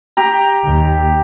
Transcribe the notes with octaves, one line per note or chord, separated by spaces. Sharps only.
G4 A#5
D#2